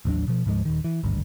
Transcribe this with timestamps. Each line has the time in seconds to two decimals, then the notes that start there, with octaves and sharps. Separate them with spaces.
0.05 A1 D#2 F#3 D4
0.28 B2 F3
0.46 D2 G#2 F3 G#3
0.65 D#1 D#3
0.84 E3
1.03 G#1 D2 G2